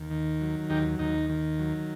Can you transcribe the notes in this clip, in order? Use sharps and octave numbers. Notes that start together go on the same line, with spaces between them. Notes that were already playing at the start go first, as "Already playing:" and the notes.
Already playing: D#2
D#3
F#3
D#2 D#4 G4
D#2 D#4
D#3
F#3